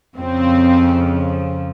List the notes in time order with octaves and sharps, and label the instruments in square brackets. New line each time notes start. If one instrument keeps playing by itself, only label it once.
[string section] F2 C#3 F3 C4